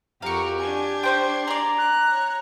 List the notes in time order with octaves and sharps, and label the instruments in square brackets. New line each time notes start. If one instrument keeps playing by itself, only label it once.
[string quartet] F2 F#4 A#4 [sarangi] G4 [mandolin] F5 C#6 [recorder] A#5
[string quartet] D4 G#6 [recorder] G#5
[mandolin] C#4 C5 G5 [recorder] C6
[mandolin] G#4 D5 [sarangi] A#5
[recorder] F#6
[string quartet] C#5